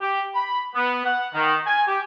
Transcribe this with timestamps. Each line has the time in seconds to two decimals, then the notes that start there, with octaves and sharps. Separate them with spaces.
0.01 G4
0.34 B5
0.75 B3
1.05 F#5
1.34 D#3
1.67 G#5
1.87 G4